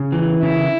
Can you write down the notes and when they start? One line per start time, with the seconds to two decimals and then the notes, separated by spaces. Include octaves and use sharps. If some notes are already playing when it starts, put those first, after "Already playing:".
Already playing: C#3
0.12 E3
0.42 C#3 E4